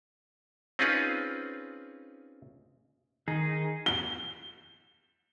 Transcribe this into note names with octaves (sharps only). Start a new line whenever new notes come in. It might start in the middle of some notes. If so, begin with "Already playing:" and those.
C4 C#4 D#4 F4 G#4 B4
D#3 D#4 G#4
G7